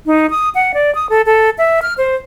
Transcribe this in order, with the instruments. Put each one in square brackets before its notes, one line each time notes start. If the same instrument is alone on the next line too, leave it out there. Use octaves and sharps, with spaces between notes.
[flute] D#4
D#6
F#5
D5
D#6
A4
A4
E5
F6
C5